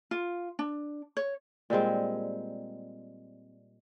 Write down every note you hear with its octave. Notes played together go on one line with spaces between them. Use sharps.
F4
D4
C#5
A#2 G3 G#3 C4